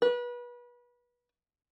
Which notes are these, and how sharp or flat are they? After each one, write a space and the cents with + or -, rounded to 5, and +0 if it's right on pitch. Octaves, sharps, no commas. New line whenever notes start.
B4 -30